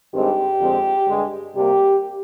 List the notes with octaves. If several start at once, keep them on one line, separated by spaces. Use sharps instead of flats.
G2 D#3 G#3 C4 G4
F2 D3 G#3 C4
G2 D3 G#3
C3 G3 A#3 G4